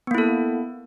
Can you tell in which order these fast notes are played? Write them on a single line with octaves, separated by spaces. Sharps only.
B3 A#3 E4 A4